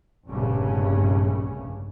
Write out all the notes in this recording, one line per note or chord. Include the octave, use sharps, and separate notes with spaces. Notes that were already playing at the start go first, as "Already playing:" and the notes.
F1 A#1 G2 C#3 G3 C#4